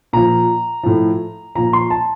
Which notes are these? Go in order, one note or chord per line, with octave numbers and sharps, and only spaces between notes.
A#2 F3 A#5
A2 F3
A#2 F3 A#5
C6
A5